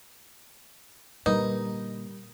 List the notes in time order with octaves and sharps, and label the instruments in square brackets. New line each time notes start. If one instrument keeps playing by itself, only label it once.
[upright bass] A#2 D3 [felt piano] G3 A#4 B4 [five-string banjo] D#4